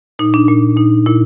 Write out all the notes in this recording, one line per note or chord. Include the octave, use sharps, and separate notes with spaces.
A#2 D#4
D4
A#2
A#2 D#4
A#2 E4